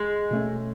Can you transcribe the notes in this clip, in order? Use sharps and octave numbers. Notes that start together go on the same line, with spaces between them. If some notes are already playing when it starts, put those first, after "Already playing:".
Already playing: G#3
B2 A3 C#4